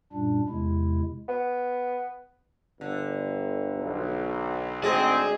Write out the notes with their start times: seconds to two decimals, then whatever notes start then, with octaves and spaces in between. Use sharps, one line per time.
0.13 F#2 A#2 G3 D4
0.49 E2 C3 G#3 E4
1.28 B3
2.81 G1 D3
3.77 B1
4.83 D2 G#2 G#3 C4 G#4 D5 D#5 G#5